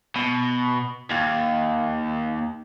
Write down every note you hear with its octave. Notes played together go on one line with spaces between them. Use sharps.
B2
D#2